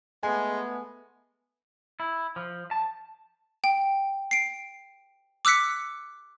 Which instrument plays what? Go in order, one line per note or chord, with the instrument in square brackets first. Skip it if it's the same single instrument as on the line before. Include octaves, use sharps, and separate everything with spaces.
[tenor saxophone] G#3 [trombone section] A3 B3 [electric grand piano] G#5
[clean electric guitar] E4
F3
A5
[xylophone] G5
C7 D7
D6 E6 F#6 B6 C#7